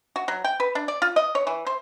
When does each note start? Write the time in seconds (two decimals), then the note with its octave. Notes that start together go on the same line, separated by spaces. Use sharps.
0.16 F#4
0.28 F#3
0.44 G5
0.60 B4
0.75 D4
0.88 D5
1.02 F4
1.16 D#5
1.35 C#5
1.47 E3
1.66 C5